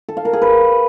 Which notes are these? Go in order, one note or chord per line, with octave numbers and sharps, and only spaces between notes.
A4
F5
A#4
G#4
B4